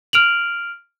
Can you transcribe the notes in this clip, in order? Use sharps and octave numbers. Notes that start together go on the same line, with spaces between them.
F6 D7 F7 F#7